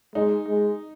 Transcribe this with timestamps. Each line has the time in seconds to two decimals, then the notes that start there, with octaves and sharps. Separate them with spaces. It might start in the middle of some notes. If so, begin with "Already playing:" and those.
0.15 G#3 D#4
0.48 G#3